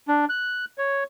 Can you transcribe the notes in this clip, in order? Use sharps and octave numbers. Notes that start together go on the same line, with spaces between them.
D4
F#6
C#5